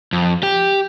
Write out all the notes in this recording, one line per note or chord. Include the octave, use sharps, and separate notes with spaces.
F2
G4